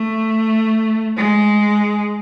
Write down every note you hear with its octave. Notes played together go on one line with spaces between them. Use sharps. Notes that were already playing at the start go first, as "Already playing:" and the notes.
Already playing: A3
G#3